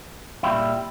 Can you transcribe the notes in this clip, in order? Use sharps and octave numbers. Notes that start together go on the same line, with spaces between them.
A#2 G3 C4 E4